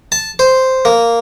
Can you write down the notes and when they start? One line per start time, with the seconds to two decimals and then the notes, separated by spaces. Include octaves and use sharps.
0.12 A5
0.39 C5
0.85 A#3